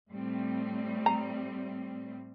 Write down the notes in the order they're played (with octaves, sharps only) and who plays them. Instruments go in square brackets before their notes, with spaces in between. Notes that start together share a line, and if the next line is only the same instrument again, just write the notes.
[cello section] A2 G3 C4
[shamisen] A#5